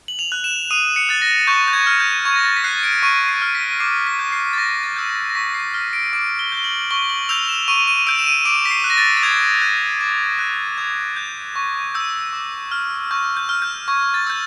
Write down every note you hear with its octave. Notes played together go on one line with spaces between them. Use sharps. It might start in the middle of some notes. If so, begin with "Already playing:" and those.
F#7
F7
F#6
E7
D#6 D#7
C#7
F#6 A6
A#6
C#6 G6
G6
G#6
F6
G6
C#6 G#6
A#6
A6
B6
F#6 C7
D7
C#6 D#7
C7
F6
B6
D6 C7
B6
G6
C7
A6
C#6 A#6
A6
E6 G6
A#6
A#6
C#6 B6
C7
F6
D7
D6 D7
G7
G6
G7
F#7
C#6 G7
F#7
E6 G6 F7
E7
C#6 D#7
D#7
E6 G6 D7
E7
D#7
D6 D7
B6
C7
F#6
A#6
A6
A6
D#6 G#6
F#6
D6
F#6
D#6 G#6
G6
C#6
E6 G6
D6
F6
C#6 G6
G6
F6
G6
C#6 G#6
A6
E6 G6